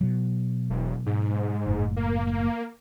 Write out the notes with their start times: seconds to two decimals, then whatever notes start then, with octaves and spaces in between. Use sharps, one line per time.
0.01 B2 F#3
0.70 E1
1.06 G#2
1.66 F#1 A2
1.97 A#3